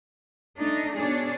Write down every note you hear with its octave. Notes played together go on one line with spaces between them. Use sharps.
A3 D4 D#4
B2 D4 G#4 C#5